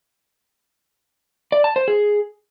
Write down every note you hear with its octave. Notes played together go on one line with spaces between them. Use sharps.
D5
A5
C5
G#4